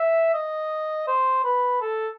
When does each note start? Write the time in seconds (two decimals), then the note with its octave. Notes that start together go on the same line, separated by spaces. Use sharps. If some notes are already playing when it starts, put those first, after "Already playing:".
Already playing: E5
0.34 D#5
1.07 C5
1.44 B4
1.82 A4